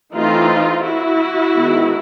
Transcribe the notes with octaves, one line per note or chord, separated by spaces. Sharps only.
E3 A3 C4 D#4 F4
E4 F#4
D#3 G#3 B3